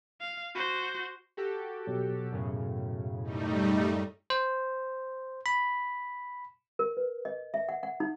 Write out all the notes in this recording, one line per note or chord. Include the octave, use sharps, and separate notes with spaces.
F5
F#4 C5
F#4 G4 A4
B2 F#3
F#2 A2 C#3
G3 A3 D#4
C5
B5
A#4
B4
D#5
E5
F#5
F#5
D#4